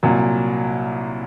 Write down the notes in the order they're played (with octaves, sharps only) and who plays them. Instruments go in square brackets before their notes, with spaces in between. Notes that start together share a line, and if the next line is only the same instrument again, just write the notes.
[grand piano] C2 A#2 F#3